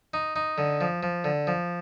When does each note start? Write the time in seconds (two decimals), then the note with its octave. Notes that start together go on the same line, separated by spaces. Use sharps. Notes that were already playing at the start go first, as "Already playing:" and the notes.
0.14 D#4
0.36 D#4
0.58 D3
0.81 F3
1.03 F3
1.24 D3
1.47 F3